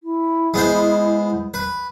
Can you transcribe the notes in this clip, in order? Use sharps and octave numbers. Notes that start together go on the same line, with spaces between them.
E4
G#3 B3 C5
B4